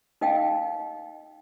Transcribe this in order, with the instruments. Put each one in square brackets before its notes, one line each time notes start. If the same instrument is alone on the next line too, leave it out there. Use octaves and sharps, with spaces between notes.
[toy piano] D#4 D#5 F5 G5